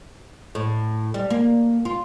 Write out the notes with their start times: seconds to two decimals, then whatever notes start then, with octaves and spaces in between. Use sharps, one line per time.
0.55 A2
1.14 G3
1.30 A#3
1.85 F4